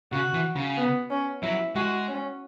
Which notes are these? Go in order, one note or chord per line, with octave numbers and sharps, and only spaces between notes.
C#3 F#4
E3
C#3
B3
C#4
F#3 E4
G#3 F#4
C#4